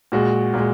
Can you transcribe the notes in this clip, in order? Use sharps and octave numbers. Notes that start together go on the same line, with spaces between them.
A#2 G#3 F#4
A#2 G#3